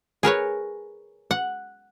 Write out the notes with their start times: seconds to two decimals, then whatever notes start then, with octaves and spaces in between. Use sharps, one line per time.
0.23 G#4 A#4 B4 C#5
1.31 F#5